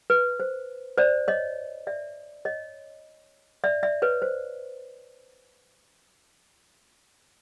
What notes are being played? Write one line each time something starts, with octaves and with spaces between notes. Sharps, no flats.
B4
C5
C5 D5
C#5 D#5
D5 E5
C#5 D#5
D5 E5
D5 E5
B4 C#5
C5